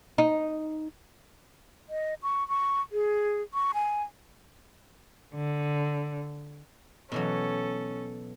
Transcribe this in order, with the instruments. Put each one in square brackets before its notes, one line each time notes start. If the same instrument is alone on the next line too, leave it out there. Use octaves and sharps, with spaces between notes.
[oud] D#4
[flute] D#5
C#6
C#6
G#4
C#6
G#5
[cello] D3
[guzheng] B2 E3 F#3 [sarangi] C#4 [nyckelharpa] A4